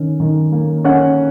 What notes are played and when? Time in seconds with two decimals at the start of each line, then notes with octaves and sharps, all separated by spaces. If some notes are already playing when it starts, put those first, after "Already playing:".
Already playing: D#3 C#4
0.20 D#3
0.52 A#3
0.85 C#4 F#5